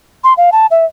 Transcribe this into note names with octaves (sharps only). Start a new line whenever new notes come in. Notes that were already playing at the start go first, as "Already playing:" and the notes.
C6
F5
A5
E5